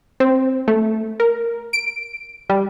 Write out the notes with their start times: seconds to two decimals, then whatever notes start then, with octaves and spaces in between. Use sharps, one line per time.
0.20 C4
0.68 A3
1.20 A#4
1.73 D7
2.49 G3